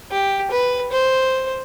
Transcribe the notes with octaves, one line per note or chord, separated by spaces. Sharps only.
G4
B4
C5